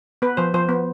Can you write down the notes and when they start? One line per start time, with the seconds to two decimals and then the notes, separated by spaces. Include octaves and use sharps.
0.22 B3 B4
0.37 F3 C5
0.54 F3 C5
0.69 B3